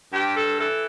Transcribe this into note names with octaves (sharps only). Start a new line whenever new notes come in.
G2 G4
A4
E3 A4